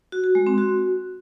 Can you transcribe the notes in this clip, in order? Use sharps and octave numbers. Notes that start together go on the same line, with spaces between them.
F#4
F#4
G#3
C4
F#4